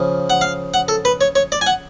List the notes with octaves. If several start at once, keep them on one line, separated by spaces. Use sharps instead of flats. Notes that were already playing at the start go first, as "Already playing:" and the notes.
Already playing: C#3 F3
F#5
F5
F#5
A4
B4
C#5
C#5
D5
G#5
F#5